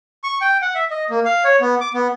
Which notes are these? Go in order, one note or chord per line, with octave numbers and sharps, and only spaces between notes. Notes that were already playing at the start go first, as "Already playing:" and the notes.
C#6
G5
F#5
E5
D#5
A#3
F5
C#5
B3
D6
B3